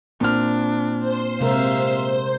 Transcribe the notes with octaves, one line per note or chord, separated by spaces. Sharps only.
A#2 C4 D4 F6
C5
C3 G#3 A#4 E5 F5